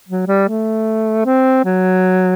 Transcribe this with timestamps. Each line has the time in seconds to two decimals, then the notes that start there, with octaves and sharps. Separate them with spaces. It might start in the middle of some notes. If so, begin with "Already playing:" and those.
0.08 F#3
0.27 G3
0.48 A3
1.26 C4
1.65 F#3